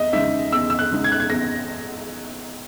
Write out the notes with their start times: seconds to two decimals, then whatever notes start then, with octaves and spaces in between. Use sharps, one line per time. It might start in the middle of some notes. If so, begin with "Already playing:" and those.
Already playing: E2 D#5 E5
0.13 C#3 G#3 D#4 E5
0.52 E2 E6
0.70 E6
0.79 F#6
0.91 C#3 G#3 D#4
1.04 G#6
1.12 F#6
1.20 G#6
1.30 E2 A#6